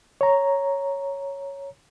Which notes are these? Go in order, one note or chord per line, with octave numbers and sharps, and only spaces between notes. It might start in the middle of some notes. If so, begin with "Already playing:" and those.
C#5 A#5